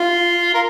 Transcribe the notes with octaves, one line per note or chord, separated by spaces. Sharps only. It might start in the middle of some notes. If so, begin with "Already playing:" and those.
Already playing: F4
A#4